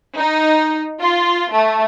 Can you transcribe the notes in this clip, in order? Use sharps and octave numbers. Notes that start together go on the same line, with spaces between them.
D#4
F4
A3